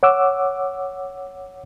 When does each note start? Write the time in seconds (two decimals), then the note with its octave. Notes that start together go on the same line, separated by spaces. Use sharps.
0.03 C#5 F#5 D6 E6